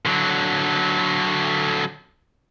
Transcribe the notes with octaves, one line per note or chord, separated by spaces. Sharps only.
D3 F#3